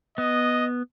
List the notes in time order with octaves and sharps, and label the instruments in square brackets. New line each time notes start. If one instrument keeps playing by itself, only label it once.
[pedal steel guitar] B3 [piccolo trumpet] D#5